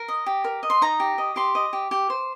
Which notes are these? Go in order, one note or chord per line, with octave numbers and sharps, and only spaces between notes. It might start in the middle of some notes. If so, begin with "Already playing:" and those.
Already playing: A#4
D#5
G4
A#4
D#5
C6
D#4 A#5
G4
D#5
G4 C6
D#5
G4
G4
C5